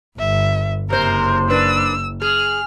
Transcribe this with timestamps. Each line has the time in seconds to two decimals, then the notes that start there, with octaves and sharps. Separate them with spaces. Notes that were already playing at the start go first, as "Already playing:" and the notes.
0.19 G1 E5
0.90 F#1 C3 A#4 C5
1.49 A#3 D4 B4 E6
2.22 G#4 F6